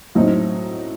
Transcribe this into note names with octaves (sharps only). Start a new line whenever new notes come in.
A2 F#3 C4 D#4